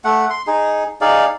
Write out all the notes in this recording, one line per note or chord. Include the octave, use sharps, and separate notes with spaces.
A3 F#5
C6
D#4 G#4
D#4 G#4 D5 F5